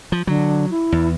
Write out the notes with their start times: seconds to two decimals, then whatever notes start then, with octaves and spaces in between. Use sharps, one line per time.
0.12 F3
0.27 D3 F#3
0.71 E4
0.92 E2